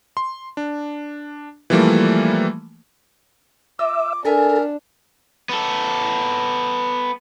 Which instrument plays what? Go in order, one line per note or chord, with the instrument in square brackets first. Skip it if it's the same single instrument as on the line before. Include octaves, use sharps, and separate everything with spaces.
[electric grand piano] C6
D4
E3 F3 G3 A3 A#3
[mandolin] F4 D#5 E6 [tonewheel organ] E5 [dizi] D6
[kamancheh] D4 [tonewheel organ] A4 [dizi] A#4 [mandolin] E5 G#5 A#5
[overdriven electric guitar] B3 A4